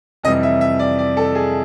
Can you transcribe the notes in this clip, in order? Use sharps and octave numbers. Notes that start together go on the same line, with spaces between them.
F2 C3 E3 G3 D#5
E5
E5
D5
D5
A4
G#4